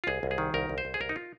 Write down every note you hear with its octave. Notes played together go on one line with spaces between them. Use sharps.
F4
C2 G#4
C2
G#4
D#3
C2 A#4
C2
C5
C2
G#4
C2 A#4
D#4
F4